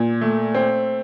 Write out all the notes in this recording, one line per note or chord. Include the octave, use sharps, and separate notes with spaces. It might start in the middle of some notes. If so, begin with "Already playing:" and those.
Already playing: A#2
A3
C4